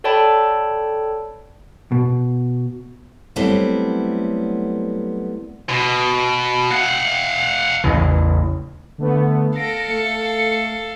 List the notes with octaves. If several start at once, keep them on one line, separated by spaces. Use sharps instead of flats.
A4 C#5 D5 G5 A5 B5
B2
F#3 G3 A3 B3 C4 E4
B2
F5 F#5
A1 E2 C#3 E3
D3 A3 B3
A4 F5 A#6 D7
A3 C#7